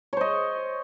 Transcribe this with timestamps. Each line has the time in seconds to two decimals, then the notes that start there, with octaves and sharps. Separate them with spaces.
0.13 C#5
0.17 C5
0.21 D#5